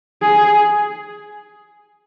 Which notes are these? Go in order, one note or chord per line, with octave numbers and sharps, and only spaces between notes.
G#4